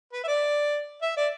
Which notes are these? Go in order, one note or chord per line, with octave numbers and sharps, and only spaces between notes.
B4
E5
D5
E5
D5